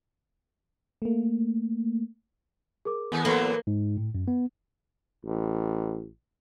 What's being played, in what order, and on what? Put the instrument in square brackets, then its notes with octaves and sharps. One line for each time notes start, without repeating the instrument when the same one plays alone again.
[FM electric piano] A3 A#3
[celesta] G#4 A#4 D6
[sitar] D#2 A3 [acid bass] B3
[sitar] A2 E3 F#3 [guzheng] A#3 [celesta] A4 B4 C#6
[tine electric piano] G#2
A2
F#2
B3
[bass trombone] A1